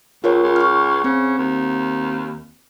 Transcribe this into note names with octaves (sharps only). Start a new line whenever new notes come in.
C#2 F4 A#4 C#5
C#2
C#6 F6
C#3 C4
D#2